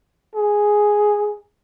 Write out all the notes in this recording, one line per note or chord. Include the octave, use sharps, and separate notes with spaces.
G#4